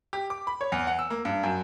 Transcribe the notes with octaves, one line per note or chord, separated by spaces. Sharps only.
G4
D6
B5
C#5
E2
F#5
E6
A#3
G2
F#2